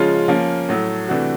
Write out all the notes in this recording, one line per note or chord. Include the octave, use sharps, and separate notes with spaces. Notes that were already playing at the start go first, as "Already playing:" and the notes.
Already playing: C#3 F3 G#3 C#4 F4
F3 A#3 C#4
A2 F#3 A3
C3 E3 A3 D4 F#4